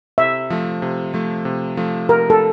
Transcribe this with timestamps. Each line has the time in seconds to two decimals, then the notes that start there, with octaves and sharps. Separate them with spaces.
0.18 C3 E5
0.50 F3 A3
0.82 C3
1.14 F3 A3
1.45 C3
1.77 F3 A3
2.09 C3 A#4
2.30 A4